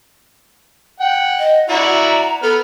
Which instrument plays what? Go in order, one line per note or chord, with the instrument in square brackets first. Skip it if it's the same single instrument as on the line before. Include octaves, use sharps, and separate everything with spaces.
[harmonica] F#5 G5
[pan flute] D#5
[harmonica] E4 F#4 D5 [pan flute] A#5
[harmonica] B3 F6 [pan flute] A4